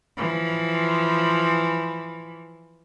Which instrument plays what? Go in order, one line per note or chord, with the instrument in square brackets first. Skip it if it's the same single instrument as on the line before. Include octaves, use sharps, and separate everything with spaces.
[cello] E3 F3